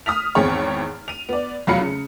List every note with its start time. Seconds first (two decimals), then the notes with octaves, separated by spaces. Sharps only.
0.06 D#6 F6 B6 F7
0.35 G#1 E2 C4 G#4 C#5
1.08 D#7 F7
1.29 B3 D5
1.67 F1 E2 F#3 F5 B5 C#7
1.81 C#3